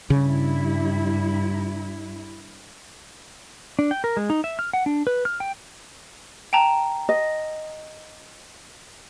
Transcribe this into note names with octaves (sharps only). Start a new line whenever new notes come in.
G2 C#3 E4
D4
G5
A#4
G#3
D#4
E5
F6
F#5
D4
B4
F6
G5
G5 A5 A#5
D#5